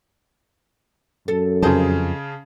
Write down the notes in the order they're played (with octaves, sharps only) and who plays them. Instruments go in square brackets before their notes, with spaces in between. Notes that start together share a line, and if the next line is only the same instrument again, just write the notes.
[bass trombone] F#2 [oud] A4
[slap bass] F2 F3 [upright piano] C#3 G#4 A5 [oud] A#4 C5 D#5